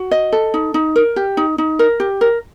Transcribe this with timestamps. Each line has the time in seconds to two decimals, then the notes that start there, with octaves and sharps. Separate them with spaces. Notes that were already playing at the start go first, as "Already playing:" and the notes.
Already playing: F#4
0.11 D#5
0.32 A4
0.54 D#4
0.74 D#4
0.96 A#4
1.16 G4
1.37 D#4
1.58 D#4
1.79 A#4
2.00 G4
2.21 A#4